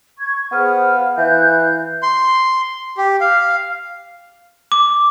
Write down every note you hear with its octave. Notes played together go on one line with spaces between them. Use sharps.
C#6 G#6
B3 G#4 C5 F6
F5
E3 F5 F#6 G6
C6
G4
F5
D6